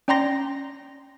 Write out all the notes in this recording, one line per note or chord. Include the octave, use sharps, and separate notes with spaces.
C#4 D5 G5 A#5 C6 A#6